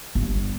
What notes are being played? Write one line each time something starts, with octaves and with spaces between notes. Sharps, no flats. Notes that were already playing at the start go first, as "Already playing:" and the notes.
G1